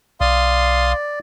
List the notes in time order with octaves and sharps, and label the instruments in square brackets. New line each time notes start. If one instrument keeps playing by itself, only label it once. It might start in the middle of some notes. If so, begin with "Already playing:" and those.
[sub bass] B1 [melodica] D5 [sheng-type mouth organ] F5 C6 D#6